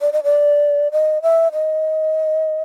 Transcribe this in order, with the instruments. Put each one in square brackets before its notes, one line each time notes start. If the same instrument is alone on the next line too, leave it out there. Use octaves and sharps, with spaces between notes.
[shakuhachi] D5
D#5
D5
D#5
E5
D#5